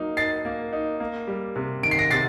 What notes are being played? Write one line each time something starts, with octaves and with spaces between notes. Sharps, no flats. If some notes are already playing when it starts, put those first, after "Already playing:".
Already playing: F#3 A#3 D#4
D#4 A6 C7
A#3
D#4
A#3
G3
C3
D#3 D7
C7
A#6 D7
C3 A6 C7